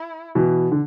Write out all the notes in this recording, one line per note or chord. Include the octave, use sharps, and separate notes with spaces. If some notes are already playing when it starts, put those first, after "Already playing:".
Already playing: E4
B2 E3
D3